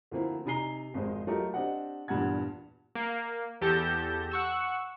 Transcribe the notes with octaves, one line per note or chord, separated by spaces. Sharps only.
D2 F3 A#3 C4 E4
C3 D#4 G#5 A#5 C7 G7
G#1 F2 G#3 C5
F#3 A3 F4 G4 A#4 D#5
C4 D4 G4 D#5 F#5
E2 G2 A#2 F#5 G#6
A#3
E2 G4 A4 A5 G6 A#6
F#5 C#6 E6